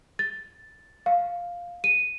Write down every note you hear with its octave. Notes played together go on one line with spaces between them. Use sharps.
A6
F5
D#7